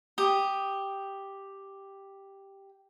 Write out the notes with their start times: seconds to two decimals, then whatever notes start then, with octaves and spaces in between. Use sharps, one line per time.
0.18 G4 D#6